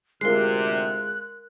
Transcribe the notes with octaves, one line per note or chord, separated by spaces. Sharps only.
D2 C3 G#3 F4 A#4 F#6 C7